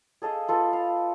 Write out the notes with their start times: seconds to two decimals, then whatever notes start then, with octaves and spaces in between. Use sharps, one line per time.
0.22 G#4 A4 D#5 F5
0.48 F4 A4 B4
0.73 F5